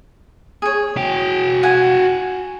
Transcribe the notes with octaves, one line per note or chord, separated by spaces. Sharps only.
G#4 C#5
F#4 G5
F#5 G#5